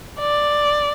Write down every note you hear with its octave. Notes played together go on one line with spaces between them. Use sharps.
D5